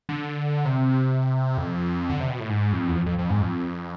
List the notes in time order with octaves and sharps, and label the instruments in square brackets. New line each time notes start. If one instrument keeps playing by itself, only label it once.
[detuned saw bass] D3
C3
F2
D3
C3
B2
A2
G#2
F2
E2
F2
F2
F2
G#2
F2